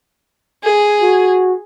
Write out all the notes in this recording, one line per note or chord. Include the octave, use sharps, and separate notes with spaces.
G#4
F#4